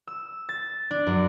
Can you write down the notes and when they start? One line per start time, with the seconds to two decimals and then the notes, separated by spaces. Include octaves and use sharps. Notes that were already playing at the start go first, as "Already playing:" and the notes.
0.07 E6
0.49 A6
0.91 D4
1.07 F#2